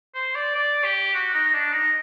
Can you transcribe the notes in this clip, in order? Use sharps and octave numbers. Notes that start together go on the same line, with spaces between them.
C5
D5
D5
G4
F#4
D#4
D4
D#4